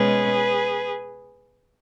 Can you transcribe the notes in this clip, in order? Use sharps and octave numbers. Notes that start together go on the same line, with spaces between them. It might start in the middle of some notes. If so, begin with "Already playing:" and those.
Already playing: B2 G#3 C#4 G#4 B4